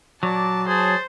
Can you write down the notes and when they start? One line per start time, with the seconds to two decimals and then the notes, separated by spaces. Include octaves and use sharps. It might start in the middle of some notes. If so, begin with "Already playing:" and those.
0.23 A#2 F#3 D5 A5 D6
0.68 G#4 C5 C#5 A5